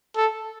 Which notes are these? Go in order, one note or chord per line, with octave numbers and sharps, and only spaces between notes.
A4